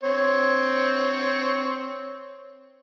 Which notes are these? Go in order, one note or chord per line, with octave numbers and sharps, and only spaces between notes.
C4 C#5